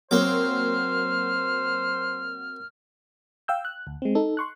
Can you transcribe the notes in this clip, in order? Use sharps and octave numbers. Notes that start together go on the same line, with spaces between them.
F#3 A#3 C4 C5 C#5 G5 D6 F6
F5 G5 E6 G6
F#6
D2
G#3 C4
D#4 A4
C6 C#6 F#6